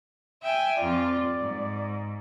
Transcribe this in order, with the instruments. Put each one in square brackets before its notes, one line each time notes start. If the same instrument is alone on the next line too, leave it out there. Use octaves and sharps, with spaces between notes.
[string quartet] E5 G5 G#5
[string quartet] F2 F4 [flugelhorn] D5
[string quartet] G#2